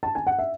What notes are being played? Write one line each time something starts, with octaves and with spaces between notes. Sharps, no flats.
A5
G#5
F#5
E5